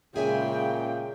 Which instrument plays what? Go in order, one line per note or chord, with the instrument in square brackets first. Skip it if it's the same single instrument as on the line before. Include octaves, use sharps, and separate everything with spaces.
[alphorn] A#2 [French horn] C#3 [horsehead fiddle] G#3 G5 [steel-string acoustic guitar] G#4 E5 G#5